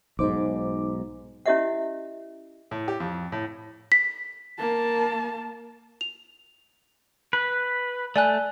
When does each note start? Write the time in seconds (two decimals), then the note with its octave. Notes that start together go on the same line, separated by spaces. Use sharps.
0.19 B1 G#2 D#4 C5 D6
1.46 C#4 E4 G4 D#5 E5 F#5
2.71 A2
2.88 G4
3.00 F2
3.32 A2
3.92 B6
4.59 A#3 A5
6.01 F7
7.33 B4
8.16 A3 D5 G#5 F#6